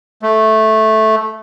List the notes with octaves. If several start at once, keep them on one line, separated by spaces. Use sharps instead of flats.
A3